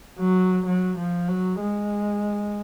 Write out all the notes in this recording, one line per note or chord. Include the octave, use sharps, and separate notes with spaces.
F#3
F#3
F3
F#3
G#3